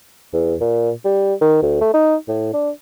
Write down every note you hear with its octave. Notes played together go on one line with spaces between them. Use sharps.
E2
A#2
G3
D#3
D2
A3
D#4
A2
D4